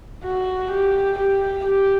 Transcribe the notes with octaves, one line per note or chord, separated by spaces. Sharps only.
F#4
G4
G4
G4